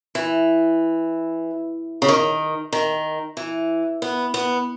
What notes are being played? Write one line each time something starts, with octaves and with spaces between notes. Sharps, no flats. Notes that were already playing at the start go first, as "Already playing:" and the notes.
E3
C#3
D#3
D#3
E3
B3
B3